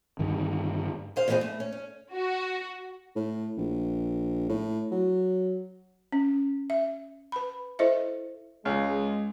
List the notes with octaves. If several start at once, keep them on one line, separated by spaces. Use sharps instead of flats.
G2 D3 D#3
G#4 C5 F5
F2 D3 E3 A#3 C4 G#4
A3
C#4
C#4
F#4
A2
A#1
A2
F#3
C#4
E5
B4 B5
E4 A4 C5 D#5 E5
C#2 G#3